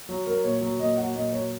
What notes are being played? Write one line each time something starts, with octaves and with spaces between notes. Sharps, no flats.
F#3
F#3 A#4
A#2 C#5
F#3
A#2 D#5
F#3 F#5
A#2 D#5
F#3 C#5